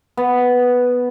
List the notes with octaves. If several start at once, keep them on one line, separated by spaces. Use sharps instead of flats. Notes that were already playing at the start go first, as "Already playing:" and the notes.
B3